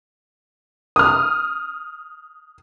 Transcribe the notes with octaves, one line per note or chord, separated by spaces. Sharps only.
D#6 F6